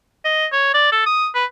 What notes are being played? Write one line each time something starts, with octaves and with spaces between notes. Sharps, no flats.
D#5
C#5
D5
A4
D#6
B4